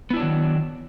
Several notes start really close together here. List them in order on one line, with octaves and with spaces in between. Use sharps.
B3 E4 D4 F#3 D#3